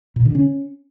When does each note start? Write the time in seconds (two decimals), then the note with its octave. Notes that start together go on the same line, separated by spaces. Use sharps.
0.16 A#2
0.25 D3
0.35 C#4